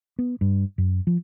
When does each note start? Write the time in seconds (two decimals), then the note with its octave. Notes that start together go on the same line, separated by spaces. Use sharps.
0.19 B3
0.41 G2
0.78 F#2
1.07 F3